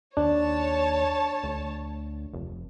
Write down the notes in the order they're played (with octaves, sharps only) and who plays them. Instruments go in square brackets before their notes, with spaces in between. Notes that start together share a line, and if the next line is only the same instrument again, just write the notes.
[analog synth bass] D#2 [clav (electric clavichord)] D4 [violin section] C#5 A5
[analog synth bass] D2
F1